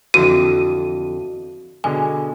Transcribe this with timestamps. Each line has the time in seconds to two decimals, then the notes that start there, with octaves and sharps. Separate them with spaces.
0.14 F2 D3 E3 F#4 D#7
1.84 B2 D3 G#3 G#5